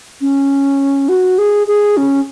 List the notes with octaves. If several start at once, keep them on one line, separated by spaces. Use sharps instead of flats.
C#4
F#4
G#4
G#4
C#4